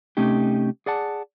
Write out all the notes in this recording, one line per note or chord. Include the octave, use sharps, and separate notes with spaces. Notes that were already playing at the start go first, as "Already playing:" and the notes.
C3 A3 C#4 D#4 G4
G#4 D5 F#5 A5